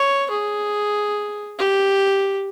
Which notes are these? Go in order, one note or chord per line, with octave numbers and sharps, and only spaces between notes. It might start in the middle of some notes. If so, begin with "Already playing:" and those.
Already playing: C#5
G#4
G4